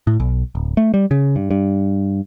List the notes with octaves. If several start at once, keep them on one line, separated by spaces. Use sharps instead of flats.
A2
B1
D1
A3
G3
C#3
G2
G2